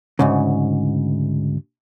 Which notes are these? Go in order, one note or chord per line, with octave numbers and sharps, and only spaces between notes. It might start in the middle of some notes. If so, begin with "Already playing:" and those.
D2 G#2 C#3